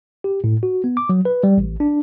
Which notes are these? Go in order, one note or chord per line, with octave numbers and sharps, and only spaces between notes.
G4
A2
F#4
B3
D6
F#3
B4
G3
A1
D4